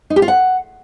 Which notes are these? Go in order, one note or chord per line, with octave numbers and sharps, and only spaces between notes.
D#4
G4
F4
F#5